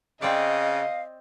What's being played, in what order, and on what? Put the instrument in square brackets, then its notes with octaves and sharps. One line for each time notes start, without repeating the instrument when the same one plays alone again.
[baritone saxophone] C#3 [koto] C4 D5 [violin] D#5 [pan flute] F5